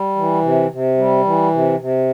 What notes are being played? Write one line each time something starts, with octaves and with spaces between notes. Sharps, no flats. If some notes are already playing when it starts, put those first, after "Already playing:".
Already playing: G3
E3
C3
C3
G3
E3
C3
C3